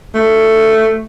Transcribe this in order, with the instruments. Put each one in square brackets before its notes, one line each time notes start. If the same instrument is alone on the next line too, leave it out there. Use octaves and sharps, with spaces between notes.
[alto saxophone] A3